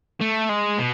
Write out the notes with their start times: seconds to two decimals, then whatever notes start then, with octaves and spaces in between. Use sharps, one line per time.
0.21 A3
0.49 G#3
0.78 B2